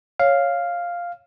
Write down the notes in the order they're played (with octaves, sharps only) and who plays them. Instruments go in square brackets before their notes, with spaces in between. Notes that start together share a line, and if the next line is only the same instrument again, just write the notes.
[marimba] C#5 [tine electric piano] F5